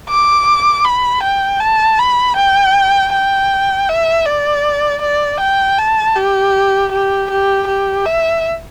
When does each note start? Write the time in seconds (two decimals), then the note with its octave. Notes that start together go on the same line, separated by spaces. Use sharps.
0.09 D6
0.85 B5
1.23 G5
1.61 A5
1.99 B5
2.37 G5
3.12 G5
3.89 E5
4.26 D5
5.02 D5
5.40 G5
5.78 A5
6.16 G4
6.92 G4
7.31 G4
7.67 G4
8.05 E5